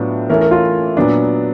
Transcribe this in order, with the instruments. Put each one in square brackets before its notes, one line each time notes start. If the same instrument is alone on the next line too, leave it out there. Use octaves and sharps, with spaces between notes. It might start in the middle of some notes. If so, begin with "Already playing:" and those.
Already playing: [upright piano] A2 F#3 B3 D4 F4
[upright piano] E3 A3 C#4 E4 [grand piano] A#4
[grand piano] A#4
F4
[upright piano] A#2 F#3 B3 [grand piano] D4